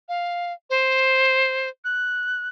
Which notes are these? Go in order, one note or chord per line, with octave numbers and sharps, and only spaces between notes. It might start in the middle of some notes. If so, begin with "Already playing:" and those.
F5
C5
F#6